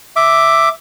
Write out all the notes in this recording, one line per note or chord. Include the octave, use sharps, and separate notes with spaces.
E5 D6